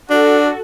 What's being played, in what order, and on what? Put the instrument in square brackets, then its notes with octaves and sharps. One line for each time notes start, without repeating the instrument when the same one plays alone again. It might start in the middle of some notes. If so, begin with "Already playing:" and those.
[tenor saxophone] D4 [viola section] F#4 A4